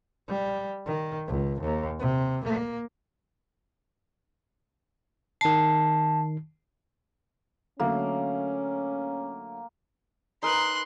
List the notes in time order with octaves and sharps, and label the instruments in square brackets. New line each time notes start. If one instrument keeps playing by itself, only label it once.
[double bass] G3
D#3
C#2
D#2
C3
A#3
[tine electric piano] D#3 C7 [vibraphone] A5
[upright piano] D3 F#3 A3 [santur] A#3 [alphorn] C#4
[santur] D#4 A#4 B4 [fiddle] C6 F#6